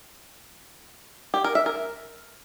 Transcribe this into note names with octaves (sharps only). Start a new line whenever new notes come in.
G4
A#4
E5
A#4